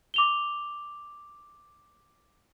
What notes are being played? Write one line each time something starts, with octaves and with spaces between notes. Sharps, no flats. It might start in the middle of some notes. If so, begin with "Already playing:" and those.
D6 F7 G7